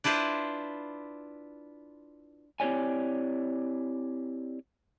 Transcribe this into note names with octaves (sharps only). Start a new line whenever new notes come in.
D4 E4 F4 B4 C5
C4 E4 G4 C#5 D5 G#5